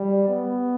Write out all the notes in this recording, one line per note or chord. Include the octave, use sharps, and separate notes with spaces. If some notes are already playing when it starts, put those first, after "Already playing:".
Already playing: G3
B3